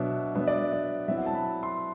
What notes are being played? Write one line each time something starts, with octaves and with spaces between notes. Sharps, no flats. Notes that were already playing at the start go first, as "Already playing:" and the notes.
Already playing: B2 F#3 B3 D4 E5
F#3 B3 D4 E5
D5
D5
F#3 C4 E4 E5
F#5
A5
B5
C6